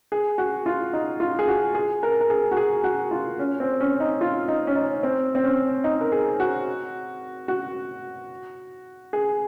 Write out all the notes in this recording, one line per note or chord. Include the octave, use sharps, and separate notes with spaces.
G#4
F#4
F4
D#4
F4
G#4
F#4
G#4
A#4
A#4
G#4
F#4
G#4
F#4
F4
C#4
C4
C#4
D#4
F4
D#4
C#4
D#4
C4
C4
C#4
D#4
A#4
G#4
F#4
F#4
G#4